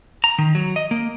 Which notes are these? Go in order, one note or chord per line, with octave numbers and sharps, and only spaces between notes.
A#5
D#3
F#3
D#5
A#3